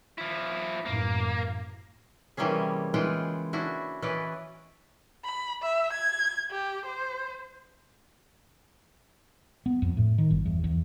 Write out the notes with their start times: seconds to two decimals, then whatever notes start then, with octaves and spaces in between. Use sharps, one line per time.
0.18 F3 E4
0.86 F#2 A2 E3 A#3
2.37 C3 E3 G3 A#3 C#4 G#4
2.94 C#3 E3 G#3 F4 F#5 G5
3.53 C#4 D4 E4 F#4
4.02 E3 C#4 E4 B4 D5 D#5
5.24 B5
5.62 E5
5.92 G#6
6.51 G4
6.86 C5
9.66 B3
9.82 F2
9.97 A2
10.18 D#3
10.31 G1
10.46 E2
10.64 E2